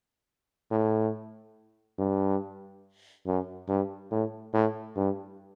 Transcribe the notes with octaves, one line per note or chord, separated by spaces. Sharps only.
A2
G2
F#2
G2
A2
A2
G2